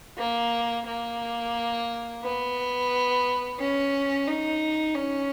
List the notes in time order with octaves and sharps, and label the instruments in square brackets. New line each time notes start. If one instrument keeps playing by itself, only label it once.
[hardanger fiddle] A#3
A#3
B3
C#4
D#4
C#4